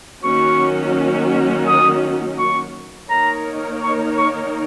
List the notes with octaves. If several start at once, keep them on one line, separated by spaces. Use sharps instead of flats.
D#3 F#3 A#3 C#4 F#4 C#6
D#6
C#6
D#3 A#3 D#4 A#4 C#5 A#5
C#6
C#6